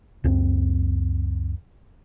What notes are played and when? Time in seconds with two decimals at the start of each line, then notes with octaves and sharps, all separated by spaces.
0.24 C#2 F#2 C4